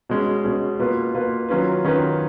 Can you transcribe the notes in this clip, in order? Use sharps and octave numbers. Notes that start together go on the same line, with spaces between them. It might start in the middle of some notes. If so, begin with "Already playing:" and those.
B2 G#3 C#4
B2 G#3 C#4
B2 A#3 F4 B4
B2 A#3 F4 B4
D#3 F#3 C#4 F4 B4
D#3 F#3 C#4 F4 B4